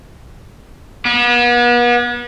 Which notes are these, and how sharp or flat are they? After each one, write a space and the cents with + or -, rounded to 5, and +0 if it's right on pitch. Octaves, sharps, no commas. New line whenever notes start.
B3 -40